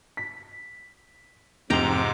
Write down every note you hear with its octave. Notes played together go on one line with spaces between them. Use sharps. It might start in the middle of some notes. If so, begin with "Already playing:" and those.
B6
F1 G#2 C3 G5 A#5 D6 F7